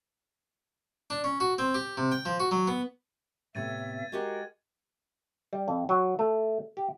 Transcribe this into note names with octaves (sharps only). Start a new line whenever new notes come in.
D4
C#4
F#4
C4
G4
C3
G5
F3
F#4
F#3
B3
A2 C3 B3 E5 G#6 A6 D#7
G#3 F#4 G4 A#4 F#5
G3
F2
F#3
A3
G4